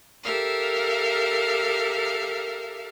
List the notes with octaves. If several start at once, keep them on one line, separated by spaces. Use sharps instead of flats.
G4 A4 A#4 E5 F5